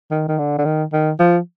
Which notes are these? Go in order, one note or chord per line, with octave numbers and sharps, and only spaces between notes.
D#3
D#3
D3
D3
D#3
D#3
F3